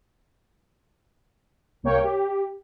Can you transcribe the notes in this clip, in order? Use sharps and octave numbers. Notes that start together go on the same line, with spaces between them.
C2 A#3 C#5 G5
G4